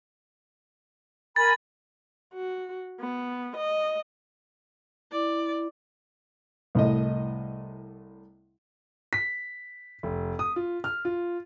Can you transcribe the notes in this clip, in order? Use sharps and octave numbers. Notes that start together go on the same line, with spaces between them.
A#4 G#5 B5 A6
F#4
B3
D#5
E4 D5
C2 A2 D#5
B6
F1
D#6
F4
F6
F4